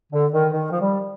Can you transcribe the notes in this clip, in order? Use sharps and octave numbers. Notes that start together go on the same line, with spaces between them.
D3
D#3
D#3
F3
G3